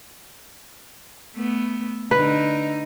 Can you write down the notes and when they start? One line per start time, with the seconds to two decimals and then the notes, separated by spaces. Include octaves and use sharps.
1.34 A3 B3
2.11 D3 D#4 B4